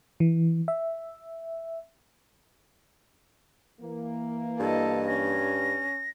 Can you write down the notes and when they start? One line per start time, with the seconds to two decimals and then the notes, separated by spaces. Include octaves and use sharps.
0.20 E3
0.68 E5
3.81 E3 A#3
4.60 G2 A4 D#5
5.07 C#4 A#6